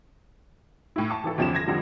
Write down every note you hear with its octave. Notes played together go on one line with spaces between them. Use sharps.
A2 E4
A5 C#6
G#1 E3 A4
G1 E2 F3 C#4 G4 E7
G#6 A#6
F2 D3 F3 G3